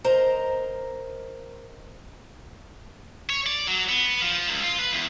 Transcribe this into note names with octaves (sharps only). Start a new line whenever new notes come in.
A#4 C5 D#5 A#5
C#5
D5
F#3
B3
F3
C#2
F4
B4
E2